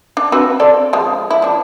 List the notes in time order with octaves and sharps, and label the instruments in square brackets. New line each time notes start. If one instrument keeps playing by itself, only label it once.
[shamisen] D4
C4 F#4 B4
C4 A4 D5
F3 G#3
E4
F3 D4